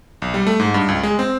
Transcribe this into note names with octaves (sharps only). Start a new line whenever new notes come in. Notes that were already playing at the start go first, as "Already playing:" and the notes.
B1
G3
A3
G#2
G2
C#2
G#3
C4